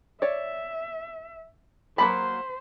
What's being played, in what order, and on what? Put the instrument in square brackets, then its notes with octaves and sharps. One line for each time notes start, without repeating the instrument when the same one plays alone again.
[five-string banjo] C#5 D5 [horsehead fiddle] E5
[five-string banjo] F#3 A#3 A5 [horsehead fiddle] C5 [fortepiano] B5